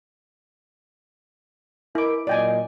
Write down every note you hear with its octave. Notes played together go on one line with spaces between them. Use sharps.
E4 A#4 D#5 D6
A#2 F#3 D5 D#5 G5 G#5